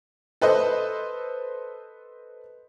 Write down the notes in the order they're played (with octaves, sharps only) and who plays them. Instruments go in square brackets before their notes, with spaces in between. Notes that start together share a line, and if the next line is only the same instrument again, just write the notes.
[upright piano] A4 B4 C5 D#5